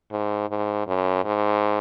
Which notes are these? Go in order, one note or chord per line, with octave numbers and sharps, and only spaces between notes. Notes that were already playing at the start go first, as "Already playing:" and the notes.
G#2
G#2
F#2
G#2